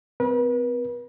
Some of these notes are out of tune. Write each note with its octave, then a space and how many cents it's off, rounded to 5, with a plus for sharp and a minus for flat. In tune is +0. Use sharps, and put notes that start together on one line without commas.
C4 -45 B4 -40